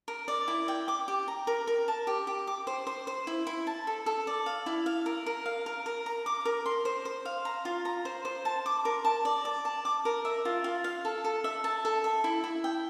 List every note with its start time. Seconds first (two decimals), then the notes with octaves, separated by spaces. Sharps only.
0.08 A#4
0.28 D5
0.48 E4
0.68 G5
0.88 D6
1.08 G4
1.28 A#5
1.47 A#4
1.67 A#4
1.88 A5
2.07 G4
2.27 G4
2.47 D6
2.67 C5
2.87 C5
3.07 C5
3.27 E4
3.47 E4
3.67 A5
3.87 A4
4.06 A4
4.27 D5
4.46 F5
4.66 E4
4.86 F5
5.06 A#4
5.26 A#4
5.46 F5
5.66 A#4
5.86 A#4
6.06 A#5
6.26 D6
6.45 A#4
6.66 C6
6.85 C5
7.05 C5
7.25 F5
7.45 A#5
7.65 F4
7.85 A#5
8.05 C5
8.25 C5
8.45 A5
8.66 D6
8.85 A#4
9.05 A5
9.25 D5
9.45 D5
9.65 A5
9.85 D6
10.05 A#4
10.25 E5
10.45 F4
10.64 F4
10.84 F5
11.05 A4
11.24 A4
11.44 E5
11.64 A5
11.85 A4
12.04 E5
12.24 E4
12.44 E4
12.64 G5